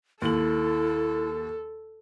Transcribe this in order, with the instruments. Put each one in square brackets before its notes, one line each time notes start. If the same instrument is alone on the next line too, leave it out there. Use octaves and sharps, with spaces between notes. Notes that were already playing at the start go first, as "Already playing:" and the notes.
[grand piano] D#2 F#7 [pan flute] E4 [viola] A4